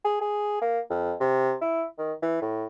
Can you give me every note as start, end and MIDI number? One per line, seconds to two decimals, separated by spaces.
0.04 0.17 68
0.21 0.60 68
0.62 0.80 58
0.90 1.14 41
1.21 1.55 48
1.62 1.85 64
1.99 2.13 51
2.22 2.40 52
2.42 2.66 45